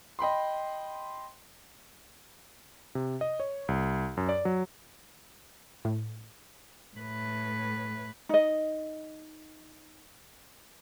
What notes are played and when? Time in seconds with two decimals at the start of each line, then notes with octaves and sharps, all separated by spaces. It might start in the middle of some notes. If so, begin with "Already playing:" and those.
0.19 D#5 G5 B5 C6
2.95 C3
3.21 D#5
3.40 C#5
3.68 C2
4.17 F#2
4.29 D5
4.45 F#3
5.85 A2
6.96 A2 B4
8.29 D#4 D#5